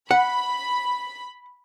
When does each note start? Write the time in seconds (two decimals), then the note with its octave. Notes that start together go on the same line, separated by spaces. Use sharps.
0.11 F#5 B5